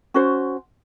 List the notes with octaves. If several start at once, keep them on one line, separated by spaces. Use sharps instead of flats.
C#4 F#4 C5